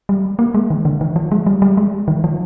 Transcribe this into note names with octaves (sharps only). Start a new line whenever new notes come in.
G3
A#3
G#3
D#3
D3
D#3
F3
G#3
G3
G3
G#3
D#3
F3